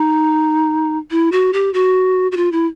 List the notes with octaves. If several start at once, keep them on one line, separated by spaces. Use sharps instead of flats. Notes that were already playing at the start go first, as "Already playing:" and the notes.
Already playing: D#4
E4
F#4
G4
F#4
F#4
F4
E4